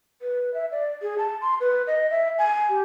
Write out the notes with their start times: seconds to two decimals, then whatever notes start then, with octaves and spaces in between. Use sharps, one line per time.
0.22 B4
0.54 E5
0.72 D5
1.02 G#4
1.18 A5
1.41 C6
1.60 B4
1.87 D#5
2.10 E5
2.38 G#5
2.69 G4